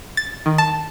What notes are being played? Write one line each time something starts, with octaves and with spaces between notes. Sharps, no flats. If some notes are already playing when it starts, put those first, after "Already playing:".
A6
D#3
A5